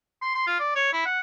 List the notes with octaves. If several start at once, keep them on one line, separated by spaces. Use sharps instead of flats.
C6
C6
F4
D5
C#5
E4
F#5